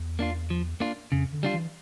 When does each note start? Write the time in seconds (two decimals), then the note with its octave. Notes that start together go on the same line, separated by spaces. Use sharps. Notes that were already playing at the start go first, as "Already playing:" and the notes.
Already playing: E2
0.19 A#3 D4 F4
0.50 F3
0.80 A#3 D4 F4
1.11 F2 C#3
1.33 D3
1.43 G3 D4 F4
1.53 E3